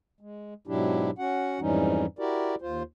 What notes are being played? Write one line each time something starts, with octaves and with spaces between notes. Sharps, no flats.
G#3
G#2 B2 F#3 D4 E4 G4
C#4 F#4 F#5
F2 G#2 E3 G3 C#4 D#4
E4 F#4 G4 A#4 D5
D#2 F4 C5